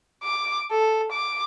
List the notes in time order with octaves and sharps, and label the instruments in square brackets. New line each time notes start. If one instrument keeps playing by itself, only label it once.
[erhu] D6
A4
D6